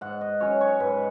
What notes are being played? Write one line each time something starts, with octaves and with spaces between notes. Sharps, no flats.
G#2 F#5
D#5
F#3 C#4 C#5
C#5
G#2 B4